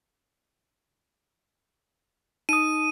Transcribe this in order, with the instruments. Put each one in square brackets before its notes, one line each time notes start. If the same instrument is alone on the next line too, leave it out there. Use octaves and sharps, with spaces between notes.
[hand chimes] D#4 D#6 [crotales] D#7